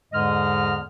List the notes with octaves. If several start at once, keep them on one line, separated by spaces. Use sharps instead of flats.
E2 G#2 D3 G#3 D#5 F6